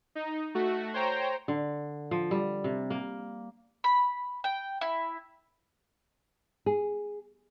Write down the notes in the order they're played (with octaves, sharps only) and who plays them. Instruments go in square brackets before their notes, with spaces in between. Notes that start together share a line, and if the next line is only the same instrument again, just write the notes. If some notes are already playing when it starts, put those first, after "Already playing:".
[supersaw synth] D#4
A3 F#4
C5 C#5 G5 A#5
[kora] D3
F3
G3
C3
A#3
[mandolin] B5
G5
E4
[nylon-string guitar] G#4